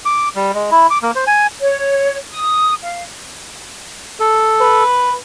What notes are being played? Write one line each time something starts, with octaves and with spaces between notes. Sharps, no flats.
D6
G3
G#3
E4
D6
A#3
C5
G#5
C#5
D#6
F5
A4
B4